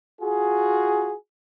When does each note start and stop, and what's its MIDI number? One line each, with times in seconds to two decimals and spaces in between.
0.21 1.13 65
0.21 1.13 66
0.21 1.13 68